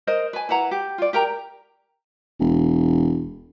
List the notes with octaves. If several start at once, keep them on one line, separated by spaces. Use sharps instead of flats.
A#4 C5 D#5
B4 G#5
E4 B4 F#5 A#5
G4
F4 D5
G4 A#4 G5 A#5
E1